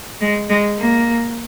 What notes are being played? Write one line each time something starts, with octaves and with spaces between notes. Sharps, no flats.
G#3
G#3
A#3